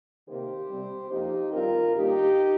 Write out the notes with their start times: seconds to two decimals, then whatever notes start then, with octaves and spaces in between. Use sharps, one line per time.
0.28 C3 D#3 A#3 G4 C5
0.70 C3 G3 C4
1.11 F2 F3 A#3 D#4 G4
1.52 G2 D#3 C4 F4 A#4
1.94 G2 D#3 A#3 D#4 G4